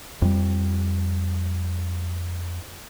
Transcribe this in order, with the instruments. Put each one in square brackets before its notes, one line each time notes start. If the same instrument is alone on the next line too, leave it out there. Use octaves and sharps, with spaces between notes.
[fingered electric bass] F2 G3